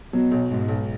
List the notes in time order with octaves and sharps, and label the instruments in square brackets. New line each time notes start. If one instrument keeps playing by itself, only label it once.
[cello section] B2 [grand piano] F#3
[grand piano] B1
[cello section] G#2 [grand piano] B2
[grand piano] B1